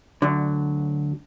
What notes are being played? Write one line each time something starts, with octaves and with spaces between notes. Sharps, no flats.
D2 D3 F#3